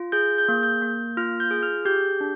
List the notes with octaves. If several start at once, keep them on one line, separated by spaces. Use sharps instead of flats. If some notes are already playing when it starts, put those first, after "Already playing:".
Already playing: F4
G#4 G6
G6
A#3
G6
A#3
F4 F6
G6
G#4
F6
G4 G6
D4